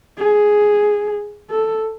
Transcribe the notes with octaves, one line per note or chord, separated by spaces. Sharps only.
G#4
A4